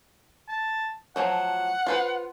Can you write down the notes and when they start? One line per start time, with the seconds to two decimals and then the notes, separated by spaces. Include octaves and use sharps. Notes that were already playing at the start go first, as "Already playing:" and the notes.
0.48 A5
1.16 F3 F#3 A3 F#5
1.87 F4 B4 C5